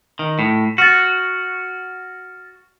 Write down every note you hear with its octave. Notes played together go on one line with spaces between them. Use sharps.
D#3
A2
F#4 F6 A6